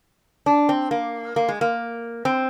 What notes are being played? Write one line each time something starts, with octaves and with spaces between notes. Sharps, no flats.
D4
C4
A#3
A#3
G#3
A#3
C4